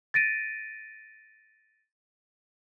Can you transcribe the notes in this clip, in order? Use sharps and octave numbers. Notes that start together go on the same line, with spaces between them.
A6 A#6 D7 D#7